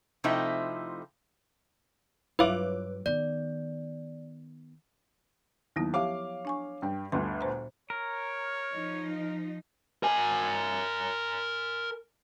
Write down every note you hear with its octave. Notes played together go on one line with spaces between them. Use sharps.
C3 F3 A3 C4 D#4 E4
G2 F#3 E4 F4 B4 C#5 D6
D#3 B3 D5
D#2 F#3 B3 E4
F3 G4 C#5 E5 F5 D6
D4 G#5 C#6
G2 G5
G1 D2 C6
A#2 C5 A#5
A#4 C#5
F3 D#4
A#4 G#5